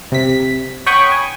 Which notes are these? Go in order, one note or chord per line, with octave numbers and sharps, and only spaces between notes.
C3 B6
C#5 F#5 G5 B5 C#6 D#6
G#5